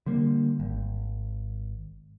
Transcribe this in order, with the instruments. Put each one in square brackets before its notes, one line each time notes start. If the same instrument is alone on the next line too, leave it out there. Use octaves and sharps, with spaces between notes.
[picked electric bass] D3 G3 A#3
G#1